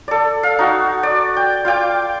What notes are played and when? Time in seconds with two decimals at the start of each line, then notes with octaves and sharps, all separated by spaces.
0.08 A4 D5
0.43 F5
0.59 D#4 F#4
1.03 D5
1.37 G5
1.65 F4 F5 G5 D6